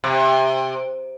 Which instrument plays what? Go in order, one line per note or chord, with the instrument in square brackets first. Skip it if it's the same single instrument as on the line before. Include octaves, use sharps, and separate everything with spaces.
[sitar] C3